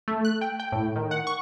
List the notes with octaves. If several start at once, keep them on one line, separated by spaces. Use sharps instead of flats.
A3
F#6
G5
G5
A2
D#3
F#5
C#6